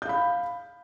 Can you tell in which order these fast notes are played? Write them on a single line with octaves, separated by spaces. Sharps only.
G6 F5 B5